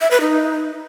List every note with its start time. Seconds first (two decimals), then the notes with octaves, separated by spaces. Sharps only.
0.01 E5
0.11 B4
0.21 D#4